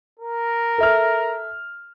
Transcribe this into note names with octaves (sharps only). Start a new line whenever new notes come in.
A#4
A4 E5 F6